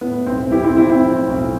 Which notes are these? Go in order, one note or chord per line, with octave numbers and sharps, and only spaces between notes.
A2 B3
B1 C4
B1 E4 G4
C4 E4
F3 C4 E4
C4 E4
A2
B1